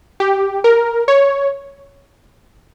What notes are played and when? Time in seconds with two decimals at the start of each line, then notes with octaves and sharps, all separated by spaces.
0.20 G4
0.64 A#4
1.08 C#5